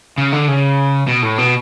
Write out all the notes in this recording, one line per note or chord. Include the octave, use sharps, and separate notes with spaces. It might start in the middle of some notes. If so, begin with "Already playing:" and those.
C#3
D3
C#3
B2
A2
B2